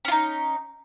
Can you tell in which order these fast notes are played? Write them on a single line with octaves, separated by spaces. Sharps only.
C#4 F4 D#4